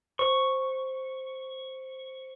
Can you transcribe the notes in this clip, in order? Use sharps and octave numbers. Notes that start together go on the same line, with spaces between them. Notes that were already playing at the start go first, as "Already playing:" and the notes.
C5 C#6